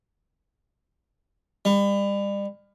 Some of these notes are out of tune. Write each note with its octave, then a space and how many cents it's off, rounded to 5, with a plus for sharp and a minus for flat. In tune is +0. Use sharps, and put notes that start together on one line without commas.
G3 +35